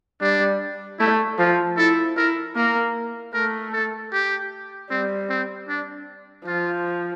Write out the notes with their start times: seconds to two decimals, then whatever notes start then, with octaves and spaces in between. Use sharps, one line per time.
0.21 G3 D4
0.99 A3 E4
1.39 F3 F4
1.77 E4 A4
2.17 E4 A#4
2.56 A#3 A#4
3.34 A3 A#4
3.73 A4
4.13 G4
4.90 G3 C4
5.30 C4
5.69 D4
6.47 F3 F4